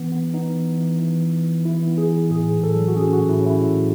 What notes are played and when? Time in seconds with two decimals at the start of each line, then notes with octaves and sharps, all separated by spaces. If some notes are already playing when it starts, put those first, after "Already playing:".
Already playing: E3 B3
0.12 B3
0.34 B3 D#4
0.56 E3
0.78 E3
1.00 E3
1.21 E3
1.43 E3
1.65 E3 E4
1.87 B3
1.98 G#4
2.09 E3
2.31 A2 G#4
2.53 A2
2.64 A4
2.75 F#3
2.88 F#4
2.96 C#4 G#4
3.13 F#4
3.19 A2
3.29 E4
3.40 C#4
3.46 E4
3.62 A2